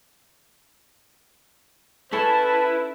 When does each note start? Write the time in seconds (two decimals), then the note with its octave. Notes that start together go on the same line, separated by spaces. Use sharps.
2.12 C#4 E4 A4 B4 A5